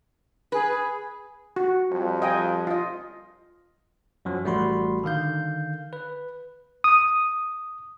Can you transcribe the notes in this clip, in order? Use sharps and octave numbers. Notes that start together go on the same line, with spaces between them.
G#4 B4
F#4
F2 F3 G3
D#5 G5 G#5
F4 D#5
F#2 F3 F#3
A1 G3 A3 F#4 B5 C6
D3 D#3 F5 G6
B4
D#6